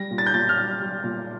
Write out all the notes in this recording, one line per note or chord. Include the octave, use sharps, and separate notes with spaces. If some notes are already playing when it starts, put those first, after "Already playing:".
Already playing: G3 A#6
A#2
A6
G6
A#2 A6
F6
G3
G3
A#2